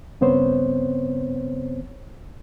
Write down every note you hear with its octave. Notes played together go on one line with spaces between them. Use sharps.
G2 C#3 B3 C4 C5 C#5